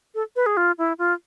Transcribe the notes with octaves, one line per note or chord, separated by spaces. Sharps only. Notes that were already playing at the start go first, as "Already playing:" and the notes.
A4
B4
G#4
F4
E4
F4